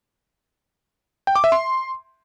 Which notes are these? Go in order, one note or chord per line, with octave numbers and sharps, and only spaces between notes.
G5
D6
E5
C6